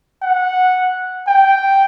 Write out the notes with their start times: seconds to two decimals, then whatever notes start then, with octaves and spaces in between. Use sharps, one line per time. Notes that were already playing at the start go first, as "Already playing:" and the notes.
0.22 F#5
1.28 G5